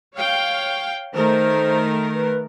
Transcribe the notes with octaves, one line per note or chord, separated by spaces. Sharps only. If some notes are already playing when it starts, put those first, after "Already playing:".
C#5 F5 G5
D#3 A3 A#4 C5
B4